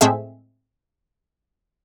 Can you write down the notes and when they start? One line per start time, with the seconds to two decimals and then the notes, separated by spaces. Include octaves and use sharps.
0.01 A2 G#3 A3 C4 G#4 E5